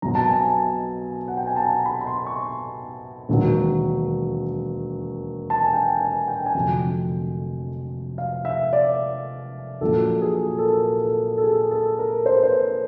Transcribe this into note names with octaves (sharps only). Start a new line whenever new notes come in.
B1 B2 F#3 A#5
A5
G#5
A5
F#5
G5
G#5
A5
A#5
B5
B5
C6
C#6
E1 D#2 D#3 F#3
A5
G#5
G5
G#5
G5
G#5
F1 F2 D3 F#3 G5
F5
E5
D5
A#1 A#2 F#3 A4
G#4
A4
A#4
A4
A4
G#4
A4
A#4
C5
B4
C5